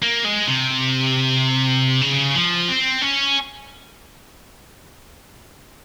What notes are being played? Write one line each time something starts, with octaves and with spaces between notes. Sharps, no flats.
A#3
G#3
C3
C#3
F3
C4
C#4